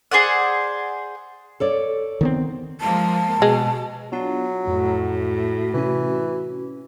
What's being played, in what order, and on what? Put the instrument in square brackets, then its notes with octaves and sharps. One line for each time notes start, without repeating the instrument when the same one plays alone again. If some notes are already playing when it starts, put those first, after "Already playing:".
[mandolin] G#4 C5 D5 F#5
[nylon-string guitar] A4 C#5 D5
[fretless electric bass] D#3 B3 C4
[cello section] F3 G#3 A#3 [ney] A5
[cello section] B2 [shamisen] G#3
[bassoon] F#3 [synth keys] B3 D4 F4
[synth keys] F2 [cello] A2 [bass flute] F#4
[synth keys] C3 C#4 [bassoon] E3